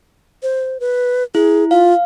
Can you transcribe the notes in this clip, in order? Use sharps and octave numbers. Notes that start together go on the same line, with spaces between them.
C5
B4
E4 G#4
F4 F5